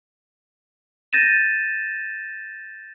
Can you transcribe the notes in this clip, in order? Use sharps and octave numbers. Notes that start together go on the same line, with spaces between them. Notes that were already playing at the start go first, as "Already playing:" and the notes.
G6 A6 A#6 D#7 E7